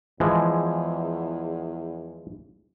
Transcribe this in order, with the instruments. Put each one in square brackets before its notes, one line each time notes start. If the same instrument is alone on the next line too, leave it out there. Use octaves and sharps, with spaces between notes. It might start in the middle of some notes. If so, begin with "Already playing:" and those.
[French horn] E2 [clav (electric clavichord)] E3 F3 G#3